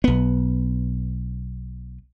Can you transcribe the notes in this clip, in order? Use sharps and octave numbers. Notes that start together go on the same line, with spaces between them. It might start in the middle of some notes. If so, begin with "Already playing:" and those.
B1 B3